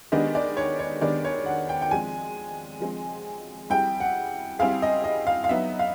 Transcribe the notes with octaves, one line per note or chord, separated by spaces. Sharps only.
D#3 G#3 B3 D4 G4 D#5
D5
C#5
C#5
D#3 G#3 B3 D4 G4 D5
C#5
F#5
G5
G5
F3 G#3 C4 G#5
F3 G#3 C4
G3 C4 E4 G#4 G5
F#5
G3 C4 E4 G#4 F5
D#5
D#5
F5
F5
F#3 B3 D#4 E5
F5